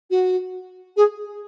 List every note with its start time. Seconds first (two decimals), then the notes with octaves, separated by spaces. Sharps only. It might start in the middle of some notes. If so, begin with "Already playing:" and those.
0.10 F#4
0.96 G#4